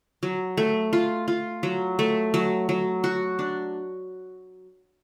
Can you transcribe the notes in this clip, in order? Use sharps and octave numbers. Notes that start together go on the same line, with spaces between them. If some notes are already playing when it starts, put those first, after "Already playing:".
F#3
A3
F4
F4
F#3
A3
F#3
F#3
F#4
D4